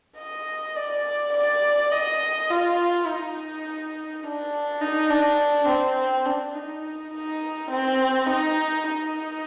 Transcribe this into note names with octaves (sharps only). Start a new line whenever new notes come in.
D#5
D5
D5
D#5
F4
D#4
D4
D#4
D4
C4
D4
D#4
D#4
C4
D#4
D#4